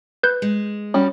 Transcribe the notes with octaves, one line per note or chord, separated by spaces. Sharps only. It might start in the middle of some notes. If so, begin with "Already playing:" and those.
B4 G6
G#3
G3 C#4 F#4